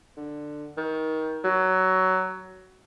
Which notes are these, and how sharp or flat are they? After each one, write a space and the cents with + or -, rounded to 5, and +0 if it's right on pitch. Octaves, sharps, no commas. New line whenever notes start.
D3 +15
D#3 +25
F#3 +15